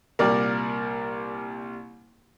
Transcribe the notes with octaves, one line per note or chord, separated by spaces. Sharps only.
C2 A#2 G3 A#4 D5